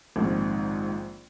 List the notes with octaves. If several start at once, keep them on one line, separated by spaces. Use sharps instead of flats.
A#1 G#2 D#3 C4